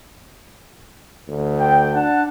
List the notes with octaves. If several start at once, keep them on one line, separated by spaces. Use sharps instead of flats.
D2
G5
D4 F#5 A5